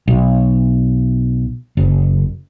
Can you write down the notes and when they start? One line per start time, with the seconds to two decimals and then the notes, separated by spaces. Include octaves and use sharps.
0.08 B1
1.77 F#1